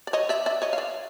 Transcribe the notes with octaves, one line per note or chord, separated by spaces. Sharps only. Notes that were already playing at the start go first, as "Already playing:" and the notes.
D5
C#5 D#5
D5 E5
D5 E5
C#5 D#5
F5
D5 E5